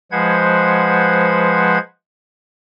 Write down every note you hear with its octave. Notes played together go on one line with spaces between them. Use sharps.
F3 G#3 B4 C5 F#5 G#6